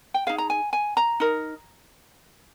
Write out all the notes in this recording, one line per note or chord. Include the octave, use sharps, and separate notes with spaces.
G5
D#4 G#4 F5
A#5
G#5
G#5
A#5
D#4 A#4